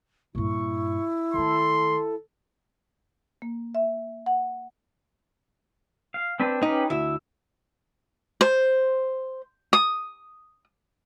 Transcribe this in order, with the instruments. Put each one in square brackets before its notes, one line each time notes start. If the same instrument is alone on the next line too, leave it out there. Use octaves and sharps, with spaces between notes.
[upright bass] G2 A#2 [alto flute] E4 [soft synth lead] C#6
[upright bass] D#3 A3 [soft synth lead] A4 [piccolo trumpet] C6
[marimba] A#3
E5
F#5
[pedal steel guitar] F5
C4 D4 B4
[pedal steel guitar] C#4 G4 B4 [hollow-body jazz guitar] D#4
[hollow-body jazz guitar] D2 E4 [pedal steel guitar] E5
[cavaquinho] C5
D#6